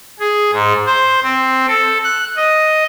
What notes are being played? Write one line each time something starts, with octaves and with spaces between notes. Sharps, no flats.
G#4
G#2
C5
C4
A4
F#6
D#5